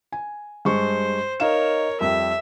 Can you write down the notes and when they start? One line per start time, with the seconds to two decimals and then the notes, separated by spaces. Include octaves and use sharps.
0.12 G#5
0.65 G2 G#3 C5 C#6
1.40 D#4 A#4 C#5 F5 E7
2.01 F2 G3 E5